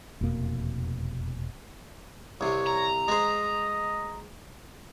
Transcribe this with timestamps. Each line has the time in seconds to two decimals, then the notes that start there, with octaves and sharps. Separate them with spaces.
0.21 F1 E2 B2 A#3
2.41 C2 C3 C#5
2.66 A#5
3.08 G#3 C5 D#5